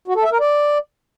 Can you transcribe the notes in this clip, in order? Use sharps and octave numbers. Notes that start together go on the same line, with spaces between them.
F#4
A4
E5
A#4
D5